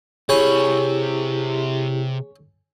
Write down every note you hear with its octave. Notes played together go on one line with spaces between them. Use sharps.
C3 E4 G4 G#4 C#5 G#5 B5